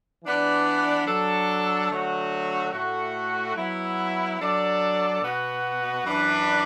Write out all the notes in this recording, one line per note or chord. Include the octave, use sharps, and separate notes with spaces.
E3 B3 D4 B4 D5
F#3 D4 A4
D3 F#3 A3 F#4
A2 A3 F#4
F#3 B3 E4
F#3 D4 A4 D5
B2 B3 F#4
F#2 E3 D4 B4